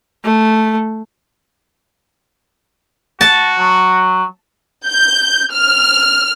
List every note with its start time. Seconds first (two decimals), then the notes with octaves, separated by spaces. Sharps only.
0.24 A3
3.21 F#4 A5
3.58 F#3
4.87 G6
5.53 F6